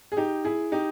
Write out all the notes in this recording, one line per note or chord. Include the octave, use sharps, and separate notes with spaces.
G#4
D#4 G4
E4 G#4
D#4 G4